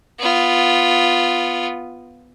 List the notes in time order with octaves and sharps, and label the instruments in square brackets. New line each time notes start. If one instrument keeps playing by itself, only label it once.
[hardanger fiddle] B3 F4